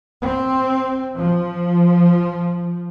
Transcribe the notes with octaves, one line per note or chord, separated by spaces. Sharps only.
C4
F3